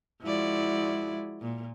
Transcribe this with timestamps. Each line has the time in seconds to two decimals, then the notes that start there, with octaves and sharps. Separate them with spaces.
0.23 F3 G#3 E4 F#4 D5
1.42 A#2